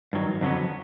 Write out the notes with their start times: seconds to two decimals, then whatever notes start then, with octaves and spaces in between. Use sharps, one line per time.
0.13 G2 D#3 F#3
0.41 F2 D3 F#3 B3